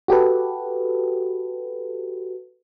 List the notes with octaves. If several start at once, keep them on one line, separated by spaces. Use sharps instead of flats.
F#4 G4 A4 B4